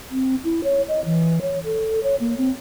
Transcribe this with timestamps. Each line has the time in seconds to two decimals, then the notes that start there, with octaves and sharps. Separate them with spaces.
0.11 C4
0.44 E4
0.64 C#5
0.88 D#5
1.05 E3
1.42 C#5
1.64 A4
2.03 C#5
2.20 A#3
2.38 C4